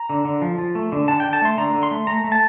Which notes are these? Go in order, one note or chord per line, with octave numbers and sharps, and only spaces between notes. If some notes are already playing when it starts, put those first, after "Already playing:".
Already playing: A#5
D3
D3
F3
F3
A3
D3
D3 A5
D3 G5
A5
A3 C6
D3 A#5
D3
C6
A3
A3 A#5
A3
A5